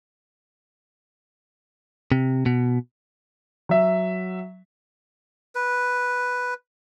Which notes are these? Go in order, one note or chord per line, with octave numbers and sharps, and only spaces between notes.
C3
B2
F#3 E5
B4